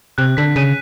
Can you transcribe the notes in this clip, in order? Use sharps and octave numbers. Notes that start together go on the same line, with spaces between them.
C3 F#6
D3 B6
C#3 D#7